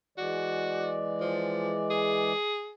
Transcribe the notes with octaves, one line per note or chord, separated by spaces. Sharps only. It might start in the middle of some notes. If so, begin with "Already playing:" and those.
E3 G#3 F#4 D5
F3
G#4